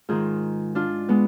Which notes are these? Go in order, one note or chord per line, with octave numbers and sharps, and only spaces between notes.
G#2 D#3 G#3 F4 G#4
D4 F4
G#3 B3